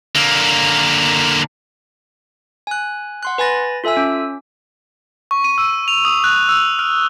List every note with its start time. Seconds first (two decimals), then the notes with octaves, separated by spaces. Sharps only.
0.16 D3 A#3
2.67 G#5 F#6
3.23 F#5 C6 F#6
3.38 B4 G#5 B5 A6 A#6
3.84 F4 A4 E5 G#5 E6
3.97 C#4
5.31 C#6
5.44 D#7
5.58 E6
5.88 F7
6.05 D#6
6.24 F#6
6.49 E6
6.79 F6